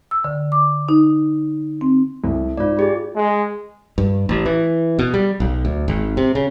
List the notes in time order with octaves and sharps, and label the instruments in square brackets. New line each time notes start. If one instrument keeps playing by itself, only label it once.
[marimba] E6
D3
D6
D#4
C4
[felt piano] C2 [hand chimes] A4
[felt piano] G#2 [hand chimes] F4 D5
[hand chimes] F4 G4 G#4
[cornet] G#3
[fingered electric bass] G2
A1
E3
B2
G3
B1
D2
G#1
C3
C#3